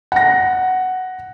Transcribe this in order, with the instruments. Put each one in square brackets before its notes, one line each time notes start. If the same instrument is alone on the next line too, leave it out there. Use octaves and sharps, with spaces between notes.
[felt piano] F#5 A#6